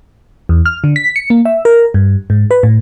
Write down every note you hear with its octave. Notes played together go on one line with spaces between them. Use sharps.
E2
F6
D3
B6
C#7
A#3
E5
A#4
G2
G#2
B4
A2